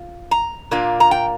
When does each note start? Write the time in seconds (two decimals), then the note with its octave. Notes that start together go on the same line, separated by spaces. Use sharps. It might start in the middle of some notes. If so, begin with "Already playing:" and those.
Already playing: F4
0.31 A#5
0.71 A#2 A#3 D4 F4
1.00 A#5
1.11 G5